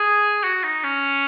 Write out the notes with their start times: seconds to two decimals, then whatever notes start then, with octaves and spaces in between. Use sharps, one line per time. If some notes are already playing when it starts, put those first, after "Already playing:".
Already playing: G#4
0.44 F#4
0.63 D#4
0.83 C#4